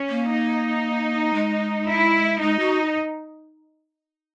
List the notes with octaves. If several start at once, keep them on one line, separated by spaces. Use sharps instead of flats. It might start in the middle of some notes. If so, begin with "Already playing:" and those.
Already playing: C#4
A#3
D#4
G#3
E4
G#3 D#4
F#4